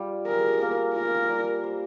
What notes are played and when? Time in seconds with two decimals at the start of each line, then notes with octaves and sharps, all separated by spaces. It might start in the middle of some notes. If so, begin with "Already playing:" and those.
Already playing: G3 F4
0.27 G#4 A#4
0.61 A#3
0.95 F4 A#4
1.29 G3
1.64 C5